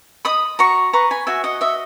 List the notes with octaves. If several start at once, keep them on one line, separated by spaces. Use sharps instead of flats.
D#5 B5 D#6
F#4 A#5 C#6
B4 A#5 C#6
G#5 B5
F#4 E5 G#5
D#5 F#5
D#5 E5